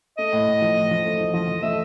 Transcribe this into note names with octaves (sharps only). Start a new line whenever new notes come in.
A3 D#5
A2
A2
F3
A2
F3
A3
F3
F3 D#5
F3
A3 E5